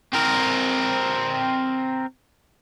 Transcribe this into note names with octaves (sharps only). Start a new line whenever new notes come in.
C4 A#4